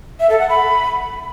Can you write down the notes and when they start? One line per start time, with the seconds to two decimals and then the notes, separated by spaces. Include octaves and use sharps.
0.20 E5
0.30 A4
0.39 F#5
0.49 B5